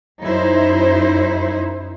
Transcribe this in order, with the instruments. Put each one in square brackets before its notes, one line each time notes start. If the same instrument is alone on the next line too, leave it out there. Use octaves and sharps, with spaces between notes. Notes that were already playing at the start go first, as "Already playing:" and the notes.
[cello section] F#2 D#4 E4 C5